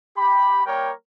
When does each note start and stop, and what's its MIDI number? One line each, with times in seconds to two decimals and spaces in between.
0.16 0.62 67
0.16 0.62 83
0.66 0.91 55
0.66 0.91 58
0.66 0.91 70
0.66 0.91 73
0.66 0.91 79